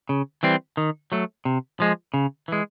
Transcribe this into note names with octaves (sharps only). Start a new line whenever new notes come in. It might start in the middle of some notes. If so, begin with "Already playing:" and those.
C#3
E3 G3 C4
D#3
F#3 A3
C3
F3 G#3
C#3
E3 G#3